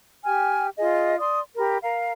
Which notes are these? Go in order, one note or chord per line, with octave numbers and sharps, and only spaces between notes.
G4 G5 G#5 F6
F4 G#4 D#5
D5 C6 D#6
G4 A#4 B5
A#4 F5 A#5